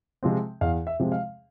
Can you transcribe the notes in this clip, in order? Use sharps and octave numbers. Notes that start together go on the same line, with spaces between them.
C3 F3 G#3 C4
E2 F5
E5
C3 F3 G#3 C4
F5